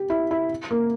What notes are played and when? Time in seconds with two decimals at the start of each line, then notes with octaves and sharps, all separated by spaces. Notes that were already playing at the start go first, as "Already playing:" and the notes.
Already playing: G4
0.10 E4
0.31 E4
0.71 A#3